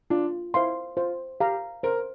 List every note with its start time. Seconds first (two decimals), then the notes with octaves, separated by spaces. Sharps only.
0.10 D4 F4
0.54 E4 C5 F5 C6
0.97 F4 C5
1.40 G4 F5 A#5
1.83 A#4 C5